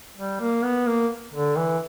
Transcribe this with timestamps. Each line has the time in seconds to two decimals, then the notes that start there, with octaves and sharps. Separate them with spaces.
0.17 G3
0.40 A#3
0.64 B3
0.87 A#3
1.34 D3
1.57 E3